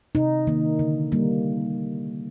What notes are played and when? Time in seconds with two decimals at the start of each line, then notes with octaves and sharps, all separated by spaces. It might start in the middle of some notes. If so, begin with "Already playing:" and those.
0.15 C3 D#4
0.47 D#3 A#3
0.79 D3
1.12 G3 A#3